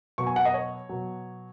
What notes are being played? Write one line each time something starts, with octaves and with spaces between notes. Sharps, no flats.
B2 F#3 C#6
G#5
F#5
D#5
C#5
B2 F#3